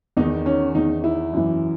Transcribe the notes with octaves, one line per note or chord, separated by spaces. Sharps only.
E2 D#3 D#4
C#4
E2 D#3 D#4
E4
F#2 E3